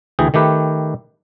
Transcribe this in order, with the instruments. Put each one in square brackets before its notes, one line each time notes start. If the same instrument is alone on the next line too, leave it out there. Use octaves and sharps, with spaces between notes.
[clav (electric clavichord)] D2 E3 G#4 G5
D#3 A3 G4 B4